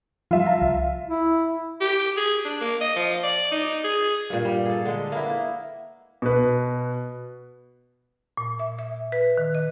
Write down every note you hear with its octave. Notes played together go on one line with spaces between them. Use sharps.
F3 G3 F4 E5
F5 A5 A#5
C2
E4
G4
G#4
D4
A#3
D#5
F3
D5
D#4
G#4
G2 A#2
G3
G#4 A4
D3 G#3
A#3 B3 E4
B2 B4
A#2
E5
E5
B4
D#3
D#5